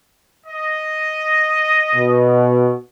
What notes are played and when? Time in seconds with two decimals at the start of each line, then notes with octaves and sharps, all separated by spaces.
0.47 D#5
1.95 B2